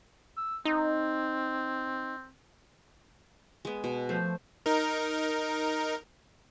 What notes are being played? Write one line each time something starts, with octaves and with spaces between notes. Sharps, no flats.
E6
C4 D#4
G#3 B3
B2
F3 A3 C5
D#4 A#4